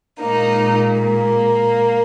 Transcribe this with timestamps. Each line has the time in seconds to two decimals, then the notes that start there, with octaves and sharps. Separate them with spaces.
0.21 A#2 G#3 A#3 D#4
1.01 A#3